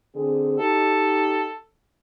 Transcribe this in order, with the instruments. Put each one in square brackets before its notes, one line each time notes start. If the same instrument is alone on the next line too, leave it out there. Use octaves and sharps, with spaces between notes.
[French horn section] D3 C4 G#4
[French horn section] D#4 G4 [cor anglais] A4